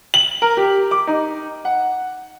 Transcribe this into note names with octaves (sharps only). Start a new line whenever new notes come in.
F#7
A#4
G4
D6
D#4
F#5